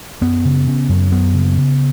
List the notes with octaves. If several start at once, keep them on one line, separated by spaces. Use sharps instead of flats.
F#2 B3
C#3
C#3
F#2
F#2 B3
C#3
C#3